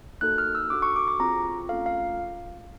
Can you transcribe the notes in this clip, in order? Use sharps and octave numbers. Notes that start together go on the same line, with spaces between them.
A#3 D#4 F#4 A4 F#6
F6
E6
D4 F#4 A4 D6
C#6
D6
D6
C4 F4 G#4 A#5
A3 C#4 F4 A4 F5
F5